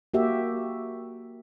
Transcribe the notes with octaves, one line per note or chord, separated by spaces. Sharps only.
A#3 F#4 G4 E5